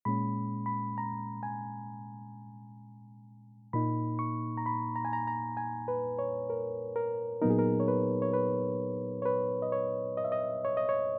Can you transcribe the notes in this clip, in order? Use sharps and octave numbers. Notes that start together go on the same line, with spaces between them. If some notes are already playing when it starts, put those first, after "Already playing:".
A#2 G#3 C#4 B5
B5
A#5
G#5
A#2 A#3 D#4 B5
C#6
A#5
B5
A#5
G#5
A#5
A#5
G#5
B4
C#5
A#4
A#4
A#2 F#3 B3 D#4 A#4
G#4
A#4
C#5
B4
C#5
B4
C#5
B4
D#5
C#5
D#5
E5
D#5
C#5
D#5
C#5